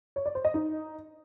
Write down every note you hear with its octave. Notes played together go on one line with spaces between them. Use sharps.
C#5
D5
C5
D#5
D#4